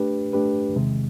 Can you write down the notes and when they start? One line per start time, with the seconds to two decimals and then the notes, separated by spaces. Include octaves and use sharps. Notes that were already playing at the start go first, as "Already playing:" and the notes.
Already playing: A3 D4 G4 B4
0.33 A3 D4 G4 B4
0.76 E2 C3 D#3 G#3